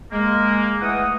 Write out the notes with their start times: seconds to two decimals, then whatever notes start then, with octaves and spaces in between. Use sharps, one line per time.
0.12 G#3 A#3
0.81 E3 A3 F#5 D#6